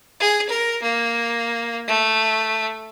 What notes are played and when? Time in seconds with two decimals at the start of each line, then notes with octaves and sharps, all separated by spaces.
0.20 G#4
0.49 A#4
0.82 A#3
1.87 A3